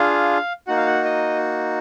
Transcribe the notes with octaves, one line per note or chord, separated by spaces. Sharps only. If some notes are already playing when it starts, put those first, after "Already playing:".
Already playing: D4 F4 G#4 F5
A#3 D#4 F#4 F#5
F5
F#5
D#5